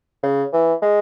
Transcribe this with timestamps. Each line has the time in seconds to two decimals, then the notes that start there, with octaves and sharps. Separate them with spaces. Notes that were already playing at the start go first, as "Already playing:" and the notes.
0.23 C#3
0.53 E3
0.82 G#3